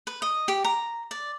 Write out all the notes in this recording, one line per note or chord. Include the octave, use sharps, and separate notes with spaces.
B4
D#5
G4
A#5
D5